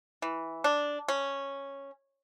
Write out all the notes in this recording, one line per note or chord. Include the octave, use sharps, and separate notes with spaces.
E3
D4
C#4